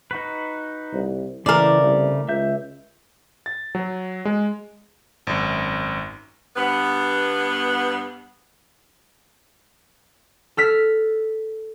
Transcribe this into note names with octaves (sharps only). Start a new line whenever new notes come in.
D#4 F#4 B4
C2
C#3 E3 A3 A#4 D5
C2
C#2 E5 G6
A6
F#3
G#3
G#1 F#2
G2 B3
A4 F6 B6